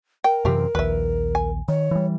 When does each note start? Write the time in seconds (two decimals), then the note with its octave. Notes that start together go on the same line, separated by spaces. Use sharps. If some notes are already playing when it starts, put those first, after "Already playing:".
0.24 A#4 G5
0.45 F#2 C3 E3 F3 C4 G4
0.75 A#1 D#2 B4 E5
1.35 G#5
1.68 D#3 C#5
1.91 E3 G3